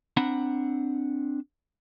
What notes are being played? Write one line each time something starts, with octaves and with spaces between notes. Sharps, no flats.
C4 D4 F#5 A#5 B5